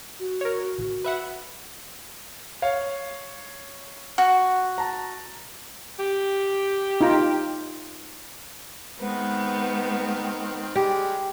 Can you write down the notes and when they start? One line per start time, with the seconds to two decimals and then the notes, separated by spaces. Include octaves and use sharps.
0.20 F#4
0.41 A#4 C#5
0.78 A1
1.04 B4 E5 F#5
2.62 C#5 F5
4.18 F#4
4.78 A5 A#5
5.99 G4
7.01 D#4 F4 A#5
9.00 D#3 G#3 B3 C4
10.75 G3 G#3 G4